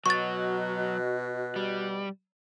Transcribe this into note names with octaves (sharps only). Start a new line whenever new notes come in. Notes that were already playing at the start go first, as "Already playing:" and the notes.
B2 F#3 F#4 D#5 C#6 F#6 A6
G3